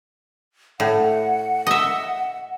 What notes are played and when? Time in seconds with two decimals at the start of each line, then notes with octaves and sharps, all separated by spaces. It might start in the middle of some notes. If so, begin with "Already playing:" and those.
0.80 A2 F#5
1.67 D#5 E5